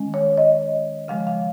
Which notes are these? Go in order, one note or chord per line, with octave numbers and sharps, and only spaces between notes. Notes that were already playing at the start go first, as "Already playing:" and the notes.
Already playing: D#3 G#3 C#4
C#5
D#5
C#3 F3 G#3 F5
F5